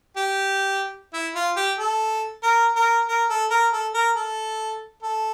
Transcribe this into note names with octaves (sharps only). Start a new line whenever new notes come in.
G4
E4
F4
G4
A4
A#4
A#4
A#4
A4
A#4
A4
A#4
A4
A4